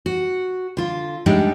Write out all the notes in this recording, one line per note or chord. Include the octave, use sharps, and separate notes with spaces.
F#4
D3 F4
A2 G3 G#3 D4 D#4